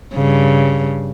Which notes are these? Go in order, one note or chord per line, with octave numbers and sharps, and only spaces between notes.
G2 C#3